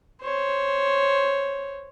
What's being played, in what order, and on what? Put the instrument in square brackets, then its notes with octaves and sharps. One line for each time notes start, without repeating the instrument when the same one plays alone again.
[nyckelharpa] C5 C#5